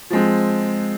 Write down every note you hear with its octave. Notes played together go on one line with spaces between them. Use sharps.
F3 G#3 C4